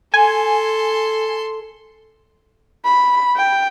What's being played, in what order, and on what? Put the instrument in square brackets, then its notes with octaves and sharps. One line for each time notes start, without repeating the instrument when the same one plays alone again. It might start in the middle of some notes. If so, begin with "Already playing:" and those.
[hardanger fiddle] A4 C6 [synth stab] G#5
[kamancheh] B5
G5